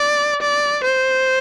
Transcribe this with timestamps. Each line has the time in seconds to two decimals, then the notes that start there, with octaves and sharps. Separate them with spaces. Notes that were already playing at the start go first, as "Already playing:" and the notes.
Already playing: D5
0.42 D5
0.85 C5